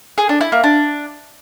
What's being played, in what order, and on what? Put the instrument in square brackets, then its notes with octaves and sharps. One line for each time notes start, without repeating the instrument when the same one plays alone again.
[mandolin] G#4
D4
E4
A#3
D4